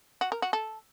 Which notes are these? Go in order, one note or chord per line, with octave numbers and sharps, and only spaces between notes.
F#4
A#4
F#4
A4